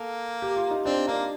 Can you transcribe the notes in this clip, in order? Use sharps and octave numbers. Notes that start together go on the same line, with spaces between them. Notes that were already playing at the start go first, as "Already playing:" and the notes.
Already playing: A#3 A4
G4
F4
D#4
C4 D4
A#3 D4